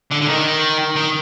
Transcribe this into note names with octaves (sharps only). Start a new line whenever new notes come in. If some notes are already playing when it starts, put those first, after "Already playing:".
D3
D3
D#3
D#3